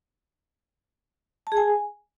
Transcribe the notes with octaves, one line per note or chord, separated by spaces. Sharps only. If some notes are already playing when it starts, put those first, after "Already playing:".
A5
G#4
G#5